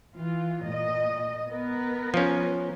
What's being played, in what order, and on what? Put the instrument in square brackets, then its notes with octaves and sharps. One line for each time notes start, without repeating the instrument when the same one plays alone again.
[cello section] E3 F4
A#2 D#5
B3 A#4 B4
[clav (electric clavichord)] F3 C#4